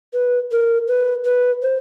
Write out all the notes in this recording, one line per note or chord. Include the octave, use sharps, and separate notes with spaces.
B4
A#4
B4
B4
C5